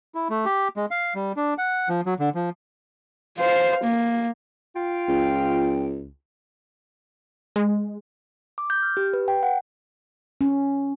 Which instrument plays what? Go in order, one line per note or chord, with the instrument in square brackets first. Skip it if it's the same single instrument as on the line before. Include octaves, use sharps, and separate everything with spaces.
[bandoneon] E4
A3
G4
G#3
F5
G3
D4
F#5
F3
F#3
D3
F3
[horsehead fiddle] C5 F5
A#3
[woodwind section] F4 G5
[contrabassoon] C#2
[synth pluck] G#3
[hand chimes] D6
G6
F6
G4
B4
G5
F#5
[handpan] C#4